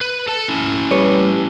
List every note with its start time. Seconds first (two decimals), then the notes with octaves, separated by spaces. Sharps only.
0.01 B4
0.28 A4 A5
0.48 C#4 E4
0.91 G3 B4 C#5